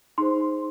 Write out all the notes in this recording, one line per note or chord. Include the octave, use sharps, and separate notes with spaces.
D#4 G#4 C5 C6